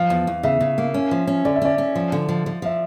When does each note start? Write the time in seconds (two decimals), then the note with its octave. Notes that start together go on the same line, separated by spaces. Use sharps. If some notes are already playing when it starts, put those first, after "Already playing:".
Already playing: F3 F5
0.10 E2
0.27 E2
0.43 C#3 E5
0.60 C#3
0.78 A#3
0.94 C#4
1.11 F3
1.27 C#4
1.45 D3 D5
1.56 E5
1.62 C#4 D5
1.78 C#4
1.95 F3
2.12 D3
2.29 F3
2.46 F3
2.62 F3 E5